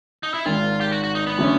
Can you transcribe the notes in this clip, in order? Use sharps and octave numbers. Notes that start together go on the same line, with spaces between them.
D#4
E4
G#1 G#2 D#3 F4
G4
F#4
F#4
D#4
B3
D3 F#3 A3 C#4